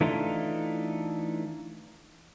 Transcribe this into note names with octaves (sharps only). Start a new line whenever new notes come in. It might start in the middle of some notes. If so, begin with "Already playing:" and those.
E3 A3 D4 D#4 F4